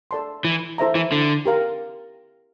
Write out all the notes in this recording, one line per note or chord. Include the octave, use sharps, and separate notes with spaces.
A4 D5 A5 C6
E3
E4 A4 C5 E5 A#5
E3
D3
G4 A#4 F5